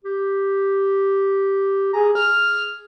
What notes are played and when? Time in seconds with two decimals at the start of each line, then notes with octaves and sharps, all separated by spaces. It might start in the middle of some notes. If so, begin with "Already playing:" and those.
0.05 G4
1.93 G#4 A#5
2.15 G#4 F6